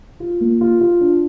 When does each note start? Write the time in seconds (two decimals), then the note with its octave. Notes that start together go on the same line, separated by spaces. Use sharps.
0.20 F4
0.40 A#3
0.61 F4
0.81 F4
1.01 D4